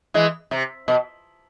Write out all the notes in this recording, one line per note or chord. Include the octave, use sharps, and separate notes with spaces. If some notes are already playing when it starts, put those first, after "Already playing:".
E3 G#3
C3
B2